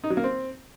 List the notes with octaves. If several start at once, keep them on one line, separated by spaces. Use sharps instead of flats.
D#4
F#3
A#3
C4